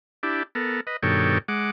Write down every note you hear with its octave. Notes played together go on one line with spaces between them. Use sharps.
D4 E4 G4
B3 A4 A#4
B4 D#5
G2 B2 D#3 A4 C#5 G5
G#3 F#5 D6